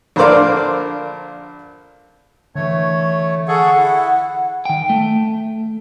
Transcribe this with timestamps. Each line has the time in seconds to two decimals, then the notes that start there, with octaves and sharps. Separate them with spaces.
0.16 A#1 D3 A#4 C5 D5 F5
2.55 D3 E3 A3 C#5
3.48 G#4 A4 F#5 C#6
3.77 E4
4.65 D#3 G5
4.90 A3